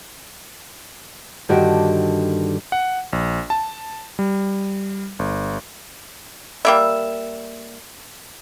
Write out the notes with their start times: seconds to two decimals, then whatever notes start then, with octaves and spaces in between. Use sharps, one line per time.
1.49 G2 D3 D#3 F#4 G4
2.72 F#5
3.13 A#1
3.50 A5
4.19 G3
5.19 G1
6.65 G3 A#3 E5